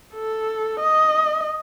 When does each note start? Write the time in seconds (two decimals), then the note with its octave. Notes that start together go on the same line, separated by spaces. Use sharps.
0.14 A4
0.80 D#5